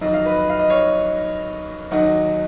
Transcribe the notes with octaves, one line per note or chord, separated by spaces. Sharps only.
F2 D#3 F#3 D#5
F5
B4 D#5
F5
D#5
C#5 F5
D#2 D#3 F#3 D#5 F#5